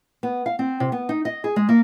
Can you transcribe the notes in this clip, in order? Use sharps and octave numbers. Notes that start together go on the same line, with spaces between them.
B3
F5
C4
C3
B3
D#4
D#5
G#4
G#3
A#3